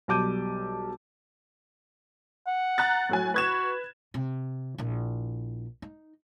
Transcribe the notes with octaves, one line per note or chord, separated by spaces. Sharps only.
B1 G3 A5 D6 G6 D#7
F#5
A#5 F#6 A6
A2 F#3 G#5
F#4 B4 G#6 E7
C3
A#1 E4
D#4